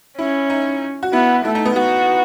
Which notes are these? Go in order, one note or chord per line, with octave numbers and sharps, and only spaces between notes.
C#4 E4
D#4
F#4
B3 E4
A3 E4
D#4
B3
B3 F#4